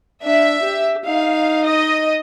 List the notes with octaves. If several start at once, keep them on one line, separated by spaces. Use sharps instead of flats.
D4 E5
G4
D#4 F5
D#5